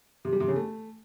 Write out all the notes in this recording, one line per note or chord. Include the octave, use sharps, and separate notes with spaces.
C3
G3
C3
C#3
A3